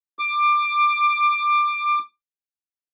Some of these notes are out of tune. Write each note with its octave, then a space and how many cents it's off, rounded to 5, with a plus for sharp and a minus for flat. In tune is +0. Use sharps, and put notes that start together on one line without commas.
D6 +20